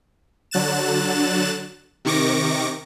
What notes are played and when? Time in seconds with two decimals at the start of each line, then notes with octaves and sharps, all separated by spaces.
0.51 D3 F#3 F#6 A6 E7
2.05 C3 D#3 C#6 D6 A#6